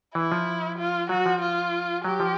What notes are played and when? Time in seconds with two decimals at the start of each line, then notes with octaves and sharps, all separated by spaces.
0.15 E3 E4
0.32 F3
0.78 F4
1.09 F#3 F#4
1.26 F3
1.41 F4
2.04 F#3 G4
2.20 F3